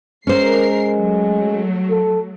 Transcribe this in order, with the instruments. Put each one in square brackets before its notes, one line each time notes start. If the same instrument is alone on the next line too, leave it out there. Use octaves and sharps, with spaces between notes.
[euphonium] G#3 [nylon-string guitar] C#4 C5 [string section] A#4 C7
[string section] F#3 A3
[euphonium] A4